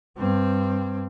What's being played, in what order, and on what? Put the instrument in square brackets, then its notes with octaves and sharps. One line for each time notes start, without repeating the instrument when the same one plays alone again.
[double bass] G2 C4